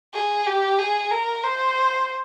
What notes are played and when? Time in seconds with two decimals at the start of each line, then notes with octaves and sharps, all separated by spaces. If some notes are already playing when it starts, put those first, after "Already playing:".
0.14 G#4
0.46 G4
0.78 G#4
1.11 A#4
1.43 C5